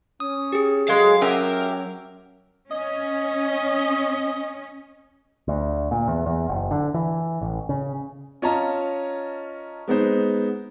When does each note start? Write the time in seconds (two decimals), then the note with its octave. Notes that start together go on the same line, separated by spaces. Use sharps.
0.20 C#4 D#6
0.52 G4 G#4
0.89 F#3 G#3 F5
1.22 C#4 G4 A#4 E5
2.71 C#4 D#5
5.48 D2
5.91 A#2
6.08 E2
6.26 E2
6.49 F#1
6.71 D3
6.94 E3
7.41 A1
7.69 C#3
8.42 C#4 F4 C#5 D#5 A5 A#5
9.88 G#3 B3 D#4 C5